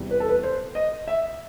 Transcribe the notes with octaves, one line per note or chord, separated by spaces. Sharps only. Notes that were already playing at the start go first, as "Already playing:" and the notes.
Already playing: E2 C3 E3 G3
B4
A4
B4
C5
D#5
E5